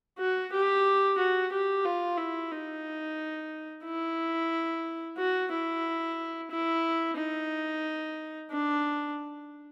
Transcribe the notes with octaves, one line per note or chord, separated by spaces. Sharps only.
F#4
G4
F#4
G4
F4
E4
D#4
E4
F#4
E4
E4
D#4
D4